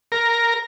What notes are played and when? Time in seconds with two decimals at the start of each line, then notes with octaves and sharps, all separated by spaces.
0.12 A#4